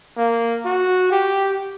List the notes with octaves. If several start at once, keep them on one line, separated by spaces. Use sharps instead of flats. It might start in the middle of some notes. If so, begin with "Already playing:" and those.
A#3
F#4
G4